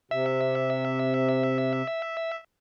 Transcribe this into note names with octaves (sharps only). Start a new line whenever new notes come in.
C3 E5